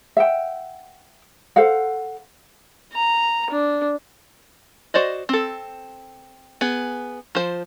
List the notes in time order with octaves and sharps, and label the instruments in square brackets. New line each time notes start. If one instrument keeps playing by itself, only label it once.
[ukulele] E5 F#5 G5
A4 C5 F5 F#5
[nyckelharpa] A#5
D4
[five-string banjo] F#4 C5 D5 D#5
C4 A4
B3 G#4
F3 C5